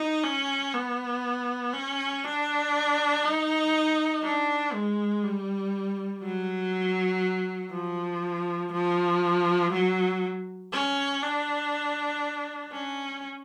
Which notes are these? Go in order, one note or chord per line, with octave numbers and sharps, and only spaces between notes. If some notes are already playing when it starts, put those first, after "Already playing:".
Already playing: D#4
C#4
B3
C#4
D4
D#4
D4
G#3
G3
F#3
F3
F3
F#3
C#4
D4
C#4